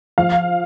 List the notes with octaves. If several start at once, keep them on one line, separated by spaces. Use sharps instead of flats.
F3 F5